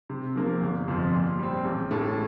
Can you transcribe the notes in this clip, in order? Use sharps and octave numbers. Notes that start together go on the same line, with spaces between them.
C3
F3 A#3
G1
F2 C3 F3
A#2
G3 C4
A1
A2 A3